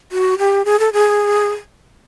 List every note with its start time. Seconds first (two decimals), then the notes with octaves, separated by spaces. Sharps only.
0.12 F#4
0.38 G4
0.65 G#4
0.80 A4
0.93 G#4